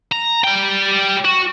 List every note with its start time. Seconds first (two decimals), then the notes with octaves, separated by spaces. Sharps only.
0.12 A#5
0.44 G3 G5
1.25 F#4